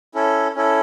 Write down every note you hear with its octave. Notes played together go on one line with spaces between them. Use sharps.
C#4 E4 A4
C#4 E4 A4